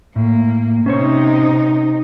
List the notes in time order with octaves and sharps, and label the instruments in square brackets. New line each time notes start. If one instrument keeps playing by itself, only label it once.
[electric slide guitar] A2 [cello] A#3
[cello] C3 D#4 [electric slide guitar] C#4 C5 C#5